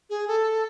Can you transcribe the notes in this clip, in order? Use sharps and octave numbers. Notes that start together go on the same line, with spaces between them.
G#4
A4